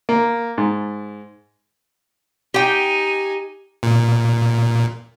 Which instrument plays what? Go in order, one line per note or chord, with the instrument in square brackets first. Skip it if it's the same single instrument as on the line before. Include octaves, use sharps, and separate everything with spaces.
[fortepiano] A#3
G#2
[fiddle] D#4 G#5 [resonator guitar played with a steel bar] G4 G5
[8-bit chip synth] A#2